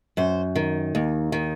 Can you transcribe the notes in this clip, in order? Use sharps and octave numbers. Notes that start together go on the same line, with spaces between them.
F#2 C5
D#3
D#2
D#3